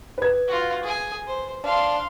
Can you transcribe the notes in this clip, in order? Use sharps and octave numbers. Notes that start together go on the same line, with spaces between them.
B4 G#6
F4 F#4
G#4 G#5
C5
D4 F5 C6